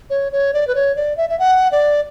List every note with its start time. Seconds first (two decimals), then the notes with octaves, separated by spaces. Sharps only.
0.10 C#5
0.32 C#5
0.54 D5
0.67 B4
0.75 C#5
0.96 D5
1.17 E5
1.30 E5
1.39 F#5
1.72 D5